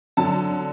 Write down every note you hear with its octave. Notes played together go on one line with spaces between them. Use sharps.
D3 F#3 A5